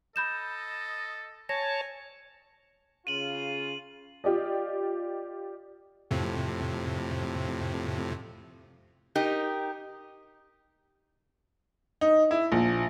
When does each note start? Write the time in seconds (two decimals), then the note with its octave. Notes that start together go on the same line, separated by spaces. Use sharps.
0.16 A4 D#5 B5 G6 E7
1.49 C#5 G#5 A5 A#6
3.07 C#3 F4 D#7 F#7
4.24 F4 G4 D5 D#5
6.11 F2 A2 C3
9.15 D#4 G4 A#4
12.01 D#4
12.31 E4
12.52 A#1